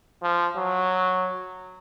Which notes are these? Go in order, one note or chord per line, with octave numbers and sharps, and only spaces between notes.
F3
F#3